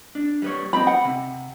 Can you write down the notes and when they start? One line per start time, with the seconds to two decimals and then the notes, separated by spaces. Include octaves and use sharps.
0.15 D4
0.42 G3 B4 C#5
0.73 B3 C4 D#4 B5
0.87 F#5
1.05 C3